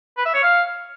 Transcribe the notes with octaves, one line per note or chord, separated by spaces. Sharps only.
B4
E5
C#5
F5